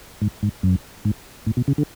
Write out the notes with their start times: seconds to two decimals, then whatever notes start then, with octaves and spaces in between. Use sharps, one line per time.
0.22 G#2
0.43 G#2
0.63 F#2
1.05 G#2
1.46 A2
1.57 B2
1.68 C#3
1.78 D3